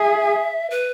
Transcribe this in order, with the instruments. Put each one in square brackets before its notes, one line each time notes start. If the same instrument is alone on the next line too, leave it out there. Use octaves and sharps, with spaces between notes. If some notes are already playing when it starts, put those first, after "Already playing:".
Already playing: [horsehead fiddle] G#4 [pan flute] E5
[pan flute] B4